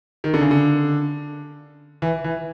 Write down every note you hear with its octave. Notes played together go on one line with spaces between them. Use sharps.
D#3
D3
C#3
D3
E3
E3